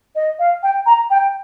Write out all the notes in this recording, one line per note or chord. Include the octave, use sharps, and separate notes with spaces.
D#5
F5
G5
A#5
G5